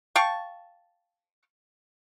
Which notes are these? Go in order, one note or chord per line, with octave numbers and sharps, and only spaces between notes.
F5 G5 A5 C#6